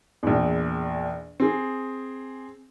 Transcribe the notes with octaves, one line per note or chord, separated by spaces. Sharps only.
A#1 E2
C4 G#4